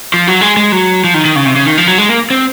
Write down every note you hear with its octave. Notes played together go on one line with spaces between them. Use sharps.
F3
F#3
G#3
G#3
F#3
F3
D#3
D#3
C#3
C3
C#3
D#3
F3
F#3
G#3
A#3
C4